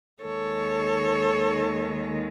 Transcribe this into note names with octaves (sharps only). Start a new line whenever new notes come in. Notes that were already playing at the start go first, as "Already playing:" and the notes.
D#2 D#3 G#3 A4 C#5